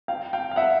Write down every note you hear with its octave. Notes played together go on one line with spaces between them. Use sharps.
F5 G5
F5 G5
F5
E5 F#5